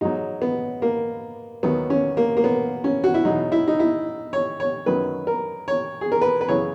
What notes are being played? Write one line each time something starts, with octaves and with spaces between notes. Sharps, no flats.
G#2 F#3 D#4
B3
A#3
D#2 D#3 F#3 B3
C#4
A#3
A#3
B3
C#4
F#4
E4
E2 B2 F#3 D#4
E4
D#4
E4
C#5
C#5
F#2 D#3 F#3 B4
A#4
C#5
G#4
A#4
B4
B4
F#2 C#3 E3 C#5